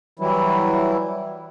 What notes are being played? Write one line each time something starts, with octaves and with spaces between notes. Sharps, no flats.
E3 F#3 G3 E4